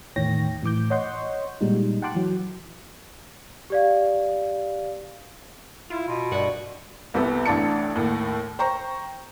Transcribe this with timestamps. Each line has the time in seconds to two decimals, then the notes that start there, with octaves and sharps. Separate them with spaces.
0.16 E2 A2 D#3 C#5 G5 A#6
0.63 A2 E3 D6 G6
0.90 C#5 D#5 F#5 C6 C#6 G6
1.61 A#2 G3 G#3 D#4
2.02 F#5 G5 A5 C6 D6 F#6
2.15 E3 F#3
3.70 G4 D5 F5
5.90 E4 F4
6.08 B2 C6
6.32 G2 F#4 A#4 D5 D#5
7.14 C2 C3 B3 A4
7.46 A1 A2 D4 A5 C#7
7.95 D#2 A2
8.59 C5 G5 A#5 C#6